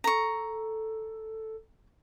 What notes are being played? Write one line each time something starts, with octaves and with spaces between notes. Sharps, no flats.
A4 A#5 C#6